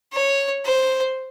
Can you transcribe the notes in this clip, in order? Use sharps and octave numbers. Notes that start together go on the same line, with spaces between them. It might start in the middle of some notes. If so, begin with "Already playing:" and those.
C#5
C5